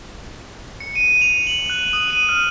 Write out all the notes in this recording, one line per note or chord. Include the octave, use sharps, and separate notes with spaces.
C#7
D#7
D#7
F7
F#7
F#6
D#6
D#7
F6